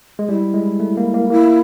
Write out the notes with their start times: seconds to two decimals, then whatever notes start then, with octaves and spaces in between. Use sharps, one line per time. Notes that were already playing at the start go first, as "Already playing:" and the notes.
0.19 G#3
0.28 G3 E4
0.54 G#3
0.80 A3
0.97 A#3
1.14 A#3
1.30 A#3 E4